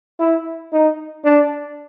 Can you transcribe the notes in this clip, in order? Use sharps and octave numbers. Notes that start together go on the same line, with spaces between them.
E4
D#4
D4